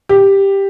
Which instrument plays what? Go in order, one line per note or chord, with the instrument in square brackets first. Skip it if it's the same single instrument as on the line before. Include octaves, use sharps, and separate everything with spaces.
[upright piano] G4